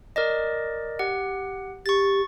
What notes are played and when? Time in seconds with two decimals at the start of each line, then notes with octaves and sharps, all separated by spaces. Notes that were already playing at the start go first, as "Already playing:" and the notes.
0.16 A#4 D5 D#5
0.99 G4 F#5
1.86 G4 C#6 A6